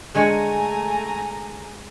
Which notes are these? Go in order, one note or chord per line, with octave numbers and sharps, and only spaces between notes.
D3 G#3 A3 C#5 G#5 A#5